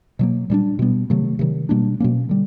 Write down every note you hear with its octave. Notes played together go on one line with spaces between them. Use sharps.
B2 F#3 A#3
A#2 G3 B3 D4
B2 G3 B3
C3 D#3 F#3 A3
C3 D#3 F#3
B2 G3 A#3 D4
B2 F#3 A#3 C#4
D3 G3